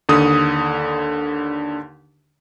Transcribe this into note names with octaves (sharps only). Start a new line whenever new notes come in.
D#2 D3 D#6